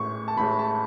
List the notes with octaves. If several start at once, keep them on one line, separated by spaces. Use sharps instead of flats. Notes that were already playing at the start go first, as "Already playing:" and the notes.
Already playing: A1 A2 G#3 C#6
A5
A1 A2 G#3 B5
A5